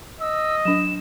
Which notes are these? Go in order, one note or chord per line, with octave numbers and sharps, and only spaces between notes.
D#5 E6
F#3 D4 E7